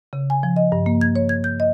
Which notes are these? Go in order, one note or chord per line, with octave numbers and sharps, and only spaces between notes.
C#3
G#5
F3
D#5
G2
A#3
G#6
C#5
G#6
G6
D#5